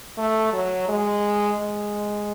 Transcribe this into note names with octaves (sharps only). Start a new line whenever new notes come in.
A3
F#3
G#3
G#3